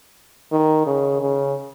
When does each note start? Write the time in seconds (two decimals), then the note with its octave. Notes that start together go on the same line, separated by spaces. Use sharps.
0.52 D#3
0.87 C#3
1.22 C#3